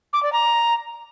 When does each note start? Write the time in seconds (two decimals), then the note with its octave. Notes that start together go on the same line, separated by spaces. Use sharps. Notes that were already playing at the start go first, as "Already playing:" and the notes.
0.13 D6
0.23 D5
0.33 A#5